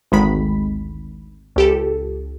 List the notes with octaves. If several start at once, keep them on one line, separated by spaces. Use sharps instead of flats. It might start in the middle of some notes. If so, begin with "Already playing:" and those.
G#1 D2 D#3 G#3 B5 B6
C#2 G4 A4